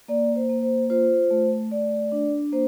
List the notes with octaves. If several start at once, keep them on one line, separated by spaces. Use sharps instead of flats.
A#3 D5
C5
A#3
C5
F4 C5
A3
A3 D5
D4
A#3 C5